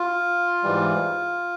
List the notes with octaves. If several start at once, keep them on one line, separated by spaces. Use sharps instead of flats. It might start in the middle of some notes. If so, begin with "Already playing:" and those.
Already playing: F4
G#2 E3 G3